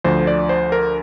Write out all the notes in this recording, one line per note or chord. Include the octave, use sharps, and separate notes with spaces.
D2 D3 F3 C5
D5
C5
A#4